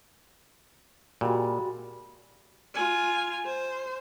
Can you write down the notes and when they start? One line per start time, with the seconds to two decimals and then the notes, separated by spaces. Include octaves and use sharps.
1.21 A#2 G3 G#3 F#4
2.75 F4 G#5
3.45 C5